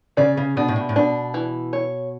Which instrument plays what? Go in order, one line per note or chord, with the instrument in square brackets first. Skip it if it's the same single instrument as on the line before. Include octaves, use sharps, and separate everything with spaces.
[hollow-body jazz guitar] C#3 [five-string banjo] D5
[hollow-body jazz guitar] C#3
[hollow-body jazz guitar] B2 [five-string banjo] D4
[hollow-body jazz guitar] A2
B2
A2
[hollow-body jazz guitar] B2 [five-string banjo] D4
[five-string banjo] E3
C#5